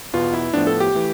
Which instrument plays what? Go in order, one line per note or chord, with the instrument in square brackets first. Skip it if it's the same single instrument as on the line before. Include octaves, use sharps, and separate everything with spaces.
[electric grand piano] E2 B2 B3 F4
E4
A2 F3 B3 D4
A4
G4
E3 A3